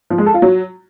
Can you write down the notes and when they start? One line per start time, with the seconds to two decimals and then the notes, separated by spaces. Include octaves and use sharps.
0.10 F3
0.18 G#3
0.26 A4
0.34 F4
0.42 F#3